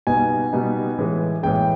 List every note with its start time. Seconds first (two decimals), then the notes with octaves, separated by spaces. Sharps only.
0.07 B2 G3 B3 D#4 G#5
0.53 B2 G3 B3 D#4
0.98 A2 E3 G#3
1.43 A2 E3 G#3 G5